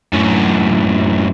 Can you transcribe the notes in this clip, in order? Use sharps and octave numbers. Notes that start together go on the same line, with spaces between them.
F#2 A2